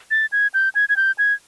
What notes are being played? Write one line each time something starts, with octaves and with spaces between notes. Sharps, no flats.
A6
G#6
G6
G#6
G#6
G6
G#6